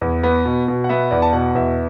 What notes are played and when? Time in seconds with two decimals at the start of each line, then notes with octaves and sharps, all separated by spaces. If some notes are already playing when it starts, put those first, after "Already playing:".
0.01 E2
0.23 B3
0.45 B2
0.68 B2
0.84 F#5
0.89 B3 E5
1.11 E2 D5
1.22 A5
1.33 B2 F#5
1.55 E2 E5